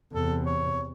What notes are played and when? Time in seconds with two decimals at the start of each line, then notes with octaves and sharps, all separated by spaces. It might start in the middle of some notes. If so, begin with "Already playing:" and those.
0.13 E2 C3 A4
0.46 C#5